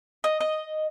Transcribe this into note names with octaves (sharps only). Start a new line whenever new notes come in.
D#5
D#5